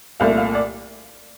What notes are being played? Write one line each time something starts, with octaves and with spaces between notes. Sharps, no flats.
C2 A#2 A3 F5
F5
D5